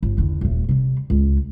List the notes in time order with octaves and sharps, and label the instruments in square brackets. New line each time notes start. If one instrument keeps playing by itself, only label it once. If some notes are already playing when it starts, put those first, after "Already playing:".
[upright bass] G1
E2 D3
D#1 A3
C3 G3
C#2